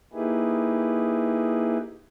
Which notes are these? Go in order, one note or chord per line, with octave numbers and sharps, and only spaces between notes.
A#3 D#4 E4 G4 G#4 B4